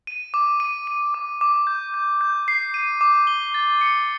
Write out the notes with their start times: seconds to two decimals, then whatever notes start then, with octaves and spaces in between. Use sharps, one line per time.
0.07 D#7
0.34 D6
0.60 D#7
0.87 D#7
1.14 D6
1.41 D6
1.67 G6
1.94 G6
2.21 G6
2.48 C7
2.74 D#7
3.01 D6
3.27 G7
3.54 A6
3.81 C#7